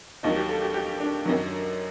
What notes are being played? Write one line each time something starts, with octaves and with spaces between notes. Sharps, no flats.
D#2 D#3 F#3 D#4
G4
A4
G4
G4
D4
F#2 D#3 F#3